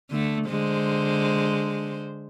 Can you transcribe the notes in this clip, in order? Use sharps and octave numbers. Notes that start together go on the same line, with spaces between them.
D3 A3
D3 G#3 C5